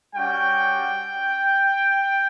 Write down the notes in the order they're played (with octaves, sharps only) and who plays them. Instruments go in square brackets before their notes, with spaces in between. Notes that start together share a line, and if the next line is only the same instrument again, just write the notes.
[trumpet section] G3 C#4 F#4 G5